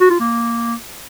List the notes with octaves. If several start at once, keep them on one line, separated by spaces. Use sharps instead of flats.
F#4
F4
A#3